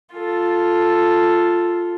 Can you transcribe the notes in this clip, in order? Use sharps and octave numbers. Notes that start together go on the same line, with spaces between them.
F4 A4